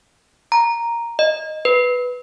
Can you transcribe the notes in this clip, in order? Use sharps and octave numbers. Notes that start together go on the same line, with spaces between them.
A#5
D#5
B4